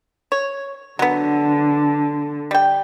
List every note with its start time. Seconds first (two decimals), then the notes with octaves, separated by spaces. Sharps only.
0.32 C#5
0.99 D3 F#3 B3
2.51 G3 G5